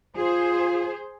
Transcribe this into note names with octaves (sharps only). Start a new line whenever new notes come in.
F4 G#4 C5